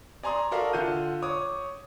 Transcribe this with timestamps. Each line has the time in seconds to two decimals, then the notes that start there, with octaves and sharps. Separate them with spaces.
0.23 D5 G#5 A#5 C6 D#6
0.51 F#4 A4 A#4 D5 E5 F5
0.73 D3 F4 F#5 G6 D#7
1.22 C#5 D6 D#6